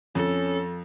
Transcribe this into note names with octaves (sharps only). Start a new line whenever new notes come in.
F2 C#4 A4